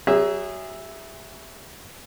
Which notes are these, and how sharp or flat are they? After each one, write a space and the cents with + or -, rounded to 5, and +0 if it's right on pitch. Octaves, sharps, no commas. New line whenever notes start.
F#3 +25 G#4 -25 E5 +0